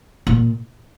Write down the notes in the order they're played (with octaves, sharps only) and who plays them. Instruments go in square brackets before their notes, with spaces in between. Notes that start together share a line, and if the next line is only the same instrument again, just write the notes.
[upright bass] A#2